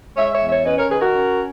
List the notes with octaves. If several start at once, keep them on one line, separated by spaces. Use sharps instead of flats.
G#3 C#5 E5
C#5 E5
E2
C#5 E5
C#4 B4 D#5
A#4 C#5
D#3 G#4 B4
F#4 A#4
C#4